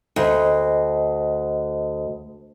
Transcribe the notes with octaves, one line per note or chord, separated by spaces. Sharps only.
D2 C5 D#5